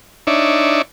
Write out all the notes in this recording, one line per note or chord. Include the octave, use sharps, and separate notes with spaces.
D4 D#4 C#5 D5 E5